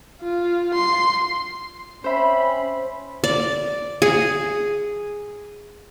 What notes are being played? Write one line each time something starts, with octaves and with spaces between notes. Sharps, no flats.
F4
C6
C4 C#4 C5 E5 B5
D5
G#4